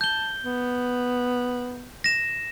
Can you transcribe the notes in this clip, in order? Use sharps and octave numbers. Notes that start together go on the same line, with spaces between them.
A5 G6 G7
B3
A#6 E7